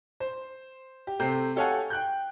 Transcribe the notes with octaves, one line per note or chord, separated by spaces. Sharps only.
C5
G4
C3 A3 C4 G6 C7
G4 A4 C#5 F5 F#5 G#5
G5 F#6 G6